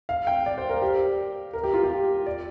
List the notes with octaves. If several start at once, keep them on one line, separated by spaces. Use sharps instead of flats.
F5
G5
D5
C5
A#4
G4
A#4
G4
F4
G4
D5